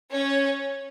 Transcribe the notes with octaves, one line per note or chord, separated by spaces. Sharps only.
C#4 C#5